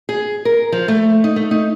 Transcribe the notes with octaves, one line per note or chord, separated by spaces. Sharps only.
G#4
A#4
F3
A3
D#4
A3
D#4